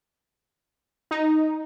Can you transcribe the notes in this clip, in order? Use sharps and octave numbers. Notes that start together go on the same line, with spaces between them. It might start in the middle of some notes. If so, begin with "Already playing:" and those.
D#4